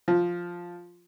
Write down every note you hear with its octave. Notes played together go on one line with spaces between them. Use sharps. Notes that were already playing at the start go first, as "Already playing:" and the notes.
F3